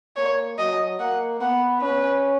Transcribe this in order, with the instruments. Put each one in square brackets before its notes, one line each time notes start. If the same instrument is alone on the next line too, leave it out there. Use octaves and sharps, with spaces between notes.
[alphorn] A#3 [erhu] C#5
[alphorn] F#3 [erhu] D#5
[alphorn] A#3 [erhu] F#5
[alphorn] B3 [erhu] F#5
[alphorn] C#4 [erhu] B4